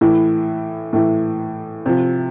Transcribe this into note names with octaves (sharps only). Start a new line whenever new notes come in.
A2 E3 E4
A2 E3
C3 F3